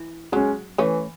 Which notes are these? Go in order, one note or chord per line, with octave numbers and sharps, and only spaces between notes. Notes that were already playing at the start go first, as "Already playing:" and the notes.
Already playing: E3
F#3 G#3 C#4
E3 A3 C#4